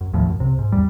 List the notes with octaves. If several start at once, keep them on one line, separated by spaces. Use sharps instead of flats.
F#2
D#2 A2 F3
F#2
C#2 C3
G#2
E2 G3